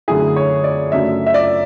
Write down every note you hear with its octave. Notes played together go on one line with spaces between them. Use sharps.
F#2 D3 F#3 A3 E4 G#4
C#5
D5
F#2 C#3 F#3 A3 D4 E5
E5
D5